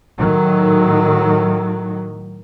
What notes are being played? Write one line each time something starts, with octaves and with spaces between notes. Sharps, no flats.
A2 D#3 F#3